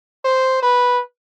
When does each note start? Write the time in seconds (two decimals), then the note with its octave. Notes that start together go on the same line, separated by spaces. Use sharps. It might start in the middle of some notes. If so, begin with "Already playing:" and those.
0.25 C5
0.62 B4